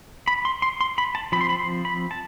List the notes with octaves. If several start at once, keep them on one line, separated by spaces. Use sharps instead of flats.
B5
C6
C6
C6
B5
A5
F3 C4 B5
C6
B5
C6
B5
A5